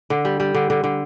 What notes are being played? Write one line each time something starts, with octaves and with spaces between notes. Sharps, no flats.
D3
G3
G3
D3
D3
D3